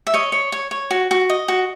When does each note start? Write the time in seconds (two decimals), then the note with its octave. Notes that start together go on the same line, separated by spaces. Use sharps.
0.07 E5
0.14 C#5 D#5
0.32 C#5
0.52 C#5
0.71 C#5
0.91 F#4
1.11 F#4
1.30 D#5
1.48 F#4